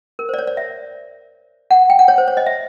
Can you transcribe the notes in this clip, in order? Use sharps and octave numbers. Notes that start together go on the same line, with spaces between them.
A#4
C5
D5
C#5
D5
E5
F#5
G5
F#5
C#5
C5
C#5
D#5
E5